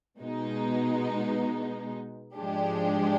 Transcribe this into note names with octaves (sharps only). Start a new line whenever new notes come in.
B2 G#3 B3 D#4
G#2 F3 G#3 D4 G4